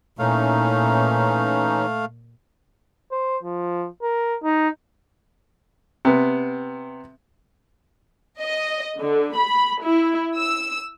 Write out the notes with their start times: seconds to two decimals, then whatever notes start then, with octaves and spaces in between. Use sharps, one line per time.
0.19 A#2 E3 A3 C#4 D#4 F5
3.12 C5
3.43 F3
4.02 A#4
4.43 D#4
6.05 C3 B3
8.42 D#5
8.99 D3
9.37 B5
9.83 E4
10.38 E6